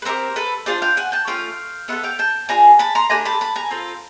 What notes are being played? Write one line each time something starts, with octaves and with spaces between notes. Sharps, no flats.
B4
C4 D#4 G4 A#4 C5
A4 B4
D4 F4 G#4 C5 D5
F5 G5
F#5 G#5
G5 A5
A3 C#4 F4 F5 G5
B3 E4 A4 E5 F#5
F5 G5
G5 A5
D4 F4 G#4 G#5 A#5
A5 B5
A#5 C6
A3 D4 G4 G#5 A#5
A5 B5
A5 B5
G#5 A#5
C4 F4 A4